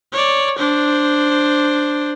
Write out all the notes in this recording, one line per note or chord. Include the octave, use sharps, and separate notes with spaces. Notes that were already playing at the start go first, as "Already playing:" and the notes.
C#5 D5
D4 C5